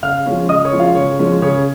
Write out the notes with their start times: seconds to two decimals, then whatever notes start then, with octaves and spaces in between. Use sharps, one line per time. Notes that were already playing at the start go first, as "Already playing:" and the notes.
0.03 C#3 F5 F6
0.26 F3 G#3 C#4
0.49 C#3 D#5 D#6
0.65 C#5 C#6
0.73 F3 G#3 C#4
0.80 F4 F5
0.95 C#3 C#5
1.19 F3 G#3 C#4
1.42 C#3 C#5